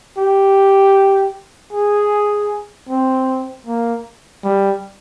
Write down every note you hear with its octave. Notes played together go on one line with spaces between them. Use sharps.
G4
G#4
C4
A#3
G3